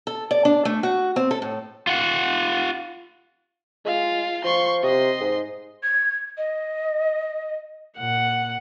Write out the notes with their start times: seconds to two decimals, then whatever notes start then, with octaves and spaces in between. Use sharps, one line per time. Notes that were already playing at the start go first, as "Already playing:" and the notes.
0.07 A4
0.31 D5
0.45 D4
0.65 A3
0.83 F#4
1.16 C4
1.31 A4
1.42 A2
1.87 F4 F#5
3.85 G#3 F4 F5
4.44 F3 C6 C#6
4.83 C3 D#5 C6
5.20 G#2
5.83 G#6
6.38 D#5
7.98 A#2 F#5